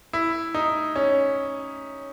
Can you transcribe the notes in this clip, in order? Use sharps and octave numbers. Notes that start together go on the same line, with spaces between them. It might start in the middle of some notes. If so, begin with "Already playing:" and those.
E4
D#4
C#4